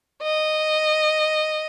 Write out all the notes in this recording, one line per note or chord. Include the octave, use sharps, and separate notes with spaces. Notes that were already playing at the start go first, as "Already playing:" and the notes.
D#5